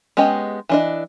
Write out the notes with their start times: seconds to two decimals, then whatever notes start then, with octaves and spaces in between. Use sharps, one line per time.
0.17 G#3 B3 C#4 G4 D#5
0.69 E3 D4 D#5